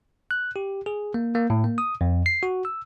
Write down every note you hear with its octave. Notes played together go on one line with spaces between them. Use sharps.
F#6
G4
G#4
A#3
A#3
A2
A#3
D#6
F2
C7
F#4
E6